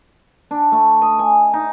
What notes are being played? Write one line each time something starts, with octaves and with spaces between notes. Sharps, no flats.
D4
A3
D#5
G#5
D#4